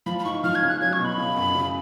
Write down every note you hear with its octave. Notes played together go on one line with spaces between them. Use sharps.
F3 B5
B5
G#2 C#6
F3 F6
G#6
C#3
F#6
F#3 G#6
C#6
B2
B5
C#3
F#2
C#3